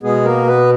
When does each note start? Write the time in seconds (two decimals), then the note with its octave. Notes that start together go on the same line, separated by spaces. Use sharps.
0.03 B2 G#3 B3 G#4
0.25 A#3 A#4
0.47 B3 B4